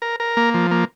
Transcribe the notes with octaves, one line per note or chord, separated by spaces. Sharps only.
A#4
A#4
A#3
F3
A#3